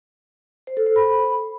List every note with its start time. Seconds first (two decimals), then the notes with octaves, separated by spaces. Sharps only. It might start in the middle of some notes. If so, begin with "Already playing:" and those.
0.67 C5
0.77 A4
0.86 C5
0.96 B5